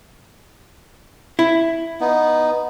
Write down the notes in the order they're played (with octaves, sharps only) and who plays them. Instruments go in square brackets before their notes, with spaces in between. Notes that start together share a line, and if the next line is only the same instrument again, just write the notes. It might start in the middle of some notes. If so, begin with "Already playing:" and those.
[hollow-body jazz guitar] E4
[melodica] B3 D#4